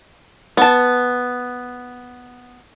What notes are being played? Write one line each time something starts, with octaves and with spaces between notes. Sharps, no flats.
B3 A5